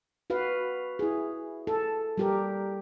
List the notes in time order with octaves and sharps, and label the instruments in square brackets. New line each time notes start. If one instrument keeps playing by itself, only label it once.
[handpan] F#4 B4 F5
E4 G#4
A4
G3 G4 A#4